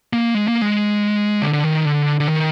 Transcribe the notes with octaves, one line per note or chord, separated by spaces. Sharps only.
A#3
G#3
A#3
G#3
D3
D3
D#3
D3
D3
D#3